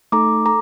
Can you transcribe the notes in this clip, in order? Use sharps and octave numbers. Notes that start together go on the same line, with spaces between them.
A3 D#4 A4 A#5 D6
A4 A#5 D6